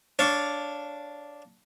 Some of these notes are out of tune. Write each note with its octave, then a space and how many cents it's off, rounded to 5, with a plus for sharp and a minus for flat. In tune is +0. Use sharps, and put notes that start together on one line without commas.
D4 -5 C#5 +10 F5 +0